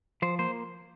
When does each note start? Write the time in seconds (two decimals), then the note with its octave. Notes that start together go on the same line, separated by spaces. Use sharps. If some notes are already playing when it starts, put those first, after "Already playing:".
0.22 F3 C5
0.39 A#3 C5